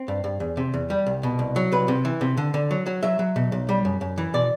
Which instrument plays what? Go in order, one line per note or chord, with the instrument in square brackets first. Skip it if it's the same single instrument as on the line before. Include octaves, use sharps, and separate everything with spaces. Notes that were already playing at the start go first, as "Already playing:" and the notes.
Already playing: [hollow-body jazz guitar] C4
G2
G2
E2
C3
E2
G3
C2
B2
C2
F#3
C2 B4
C3
E3
C3
D3
D3
F#3
F#3
F#3 E5
F#3
B2
B1
G3
F#2
F#2
E3
B2 D5